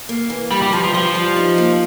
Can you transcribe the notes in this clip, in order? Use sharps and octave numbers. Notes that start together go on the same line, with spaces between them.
A#3
E3
G2 G3
G3
G2 F3
F3
G2 F3
G3
D#4
A#3